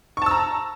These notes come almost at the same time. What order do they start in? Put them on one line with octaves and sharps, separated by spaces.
C#6 A5 E6 A#5